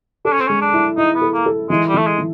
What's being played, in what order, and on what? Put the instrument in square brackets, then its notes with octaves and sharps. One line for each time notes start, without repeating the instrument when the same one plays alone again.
[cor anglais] D4 [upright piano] A4
[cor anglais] C#4
C4
[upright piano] G#3 [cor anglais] C#4
[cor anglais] D4
[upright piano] E4
[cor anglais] D#4 [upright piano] E4
[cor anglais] B3
[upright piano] A4
[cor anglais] A#3
[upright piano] A4
[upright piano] E3 [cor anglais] G#3
[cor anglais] G3
[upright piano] E3 [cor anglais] A3
[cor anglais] G#3
[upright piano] E3